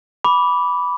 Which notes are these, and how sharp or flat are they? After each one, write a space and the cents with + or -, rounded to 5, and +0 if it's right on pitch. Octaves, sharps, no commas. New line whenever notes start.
B5 -5 D6 -15